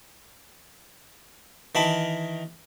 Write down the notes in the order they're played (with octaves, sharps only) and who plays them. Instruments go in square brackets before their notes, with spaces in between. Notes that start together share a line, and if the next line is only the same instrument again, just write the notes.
[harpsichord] D#3 E3 A5 B5